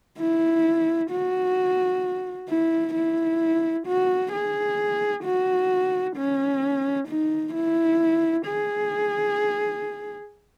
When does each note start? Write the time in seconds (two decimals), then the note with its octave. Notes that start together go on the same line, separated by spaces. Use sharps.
0.19 E4
1.11 F#4
2.49 E4
2.95 E4
3.87 F#4
4.33 G#4
5.24 F#4
6.17 C#4
7.09 D#4
7.54 E4
8.46 G#4